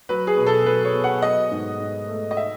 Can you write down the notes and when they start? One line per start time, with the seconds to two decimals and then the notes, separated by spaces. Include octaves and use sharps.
0.09 F#3 B4
0.27 G#4
0.37 B2
0.46 A4
0.65 F#3 B4
0.85 C#5
0.94 B3
1.04 F#5
1.22 F#3 D#5
1.51 G#2
1.80 G#2
2.08 A3
2.31 D#5
2.37 E5